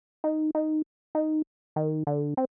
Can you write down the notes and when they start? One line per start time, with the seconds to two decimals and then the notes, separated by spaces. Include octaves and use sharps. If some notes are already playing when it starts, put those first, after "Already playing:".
0.24 D#4
0.55 D#4
1.15 D#4
1.76 D#3
2.07 D3
2.37 C4